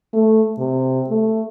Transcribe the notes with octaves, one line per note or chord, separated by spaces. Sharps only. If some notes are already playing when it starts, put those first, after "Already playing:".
A3
C3
A3